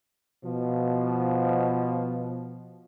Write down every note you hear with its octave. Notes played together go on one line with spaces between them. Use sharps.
B2 F3